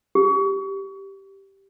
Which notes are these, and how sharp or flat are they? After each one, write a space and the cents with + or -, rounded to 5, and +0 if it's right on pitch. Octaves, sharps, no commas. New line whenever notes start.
G4 -5